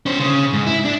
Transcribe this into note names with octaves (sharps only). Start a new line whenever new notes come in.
C#4 C5
C#3
G#2
E4
D4